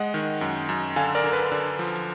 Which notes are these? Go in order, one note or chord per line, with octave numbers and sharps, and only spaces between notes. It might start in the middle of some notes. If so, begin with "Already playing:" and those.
Already playing: G#3 D#5 F#5
D#3
F#2
F#2
D3 F5 G#5
A#4 D5
D3
B4
D3
F3